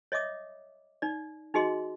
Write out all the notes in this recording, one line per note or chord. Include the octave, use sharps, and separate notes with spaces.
C#5 D#5 E5 D6 D#6
D#4 D5
D#4 F#4 G#4 D#5 C6